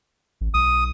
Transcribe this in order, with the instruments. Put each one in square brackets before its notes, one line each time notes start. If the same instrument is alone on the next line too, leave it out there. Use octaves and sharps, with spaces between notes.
[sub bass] A1
[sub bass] B1 [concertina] D#6